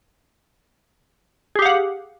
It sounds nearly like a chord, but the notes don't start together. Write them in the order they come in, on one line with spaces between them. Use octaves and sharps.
G#4 G4 F5 F#5